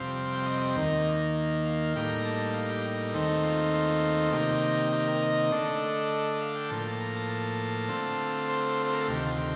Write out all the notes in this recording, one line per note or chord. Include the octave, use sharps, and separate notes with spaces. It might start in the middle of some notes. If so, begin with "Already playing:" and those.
Already playing: F2 C3 G3 C4 F5
G5
F5
D#5
D#5
D#2 D#3 A#3
F5
A2 G3 A#3 D#4 G5
A#5
A5
F5
G4
D#2 D#3 A3 C4 D#4
F4
F4
C3 D#3 A#3 D#4 G4
G4
A#4
D#5
D3 A3 D4
D#5
F5
G5
A2 F3 A#3 A5
G5
A5
A#5
A5
A5
D3 A3 C4 F4
C5
C5
A#4
A4
D2 C3 D#3 G4
F4
G4